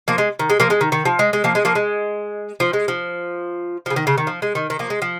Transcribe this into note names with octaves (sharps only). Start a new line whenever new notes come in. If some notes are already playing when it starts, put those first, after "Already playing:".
F3 A#3
G#3
D#3
G#3
F3 A#3
G#3
D#3
D#3
F3
G#3
G#3
F3 A#3
G#3
F3 A#3
G#3
F3
G#3
F3
C#3 F3
D#3
C#3
D#3
F3
G#3
D#3
D#3
F3 A#3
G#3
F3